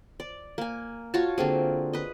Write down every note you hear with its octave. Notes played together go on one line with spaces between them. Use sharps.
D5
A#3 G#5
F4 F#4 C#5 A5
D3 A#3 C4 G#4
B4 D#5